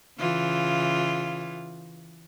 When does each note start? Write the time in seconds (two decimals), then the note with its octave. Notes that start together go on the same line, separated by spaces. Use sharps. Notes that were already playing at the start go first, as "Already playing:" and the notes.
0.19 C#3 E3 F4